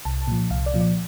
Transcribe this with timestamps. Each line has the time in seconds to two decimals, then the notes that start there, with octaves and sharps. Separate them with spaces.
0.05 C2 A5
0.28 A#2 F3
0.50 C2 F5
0.66 D5
0.74 A#2 F3
0.81 D5